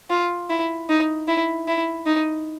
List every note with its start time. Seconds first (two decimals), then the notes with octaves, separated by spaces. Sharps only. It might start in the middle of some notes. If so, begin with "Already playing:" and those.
0.10 F4
0.50 E4
0.89 D#4
1.28 E4
1.68 E4
2.06 D#4